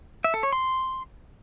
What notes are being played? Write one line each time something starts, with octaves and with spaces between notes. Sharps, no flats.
E5
A4
C#5
C6